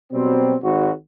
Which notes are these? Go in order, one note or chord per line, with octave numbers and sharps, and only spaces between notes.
B2 F#3 G3 C4
G#1 F#4